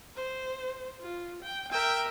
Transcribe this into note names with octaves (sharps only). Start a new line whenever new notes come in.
C5
F4
G5
A#4 E5 G5